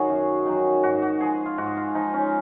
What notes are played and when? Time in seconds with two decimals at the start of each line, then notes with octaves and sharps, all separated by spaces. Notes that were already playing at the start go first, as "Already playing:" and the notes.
Already playing: D#3 F#3 F#4 G#4
0.09 F#2
0.46 D#3 F#3
0.83 G#2 F#4
1.02 F#4
1.20 F3 G#4
1.46 F4
1.58 G#2 F#4
1.77 F4
1.95 F3 D#4
2.14 C#4